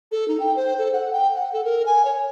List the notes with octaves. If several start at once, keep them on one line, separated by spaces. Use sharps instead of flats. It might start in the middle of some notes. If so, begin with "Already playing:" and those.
A4
D#4
G5
C5
A4
F#5
G5
F#5
A4
A#4
G#5
C#5